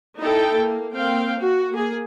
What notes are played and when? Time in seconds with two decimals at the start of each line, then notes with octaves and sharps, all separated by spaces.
0.20 D#4 E4 A4 G5
0.59 A#3
0.96 A#3 C4 F5 G5
1.38 F#4
1.73 A#3 G#4